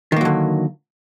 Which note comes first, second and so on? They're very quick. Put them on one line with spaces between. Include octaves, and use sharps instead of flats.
D#3 A#3 F#3 D3